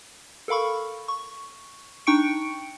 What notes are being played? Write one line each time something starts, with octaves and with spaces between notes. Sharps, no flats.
A4 A#4 F5 B5 C#6
C#6
D4 D#4 G5 C#6 C#7 D7